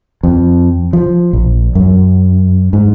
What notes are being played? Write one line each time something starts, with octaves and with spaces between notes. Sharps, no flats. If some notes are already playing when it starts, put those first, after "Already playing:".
F2
F3
A#1
F#2
G#2